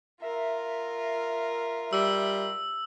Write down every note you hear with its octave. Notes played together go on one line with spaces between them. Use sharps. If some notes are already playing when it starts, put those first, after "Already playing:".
F4 A#4 E5
G3 E6